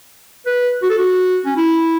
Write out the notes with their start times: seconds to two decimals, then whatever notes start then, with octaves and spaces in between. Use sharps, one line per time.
0.46 B4
0.83 F#4
0.90 A4
0.97 F#4
1.46 C#4
1.57 E4